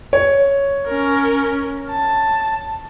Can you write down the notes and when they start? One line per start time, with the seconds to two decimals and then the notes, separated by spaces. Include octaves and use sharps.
0.13 C#5
0.87 C#4 A#4
1.90 A5